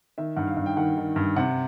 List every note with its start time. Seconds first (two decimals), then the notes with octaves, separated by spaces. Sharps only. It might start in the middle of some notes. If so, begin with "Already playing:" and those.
0.18 D#3 E5
0.36 G2 F#5
0.47 F5
0.57 G2
0.66 G5
0.77 D#3 F#5
0.97 D#3
1.16 G2
1.36 C3 F#5